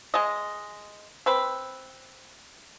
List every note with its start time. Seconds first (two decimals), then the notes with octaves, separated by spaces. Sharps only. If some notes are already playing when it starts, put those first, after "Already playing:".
0.14 G#3 D#5
1.26 C4 B4